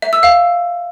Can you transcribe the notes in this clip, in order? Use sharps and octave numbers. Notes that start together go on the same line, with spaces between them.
E5
E6
F5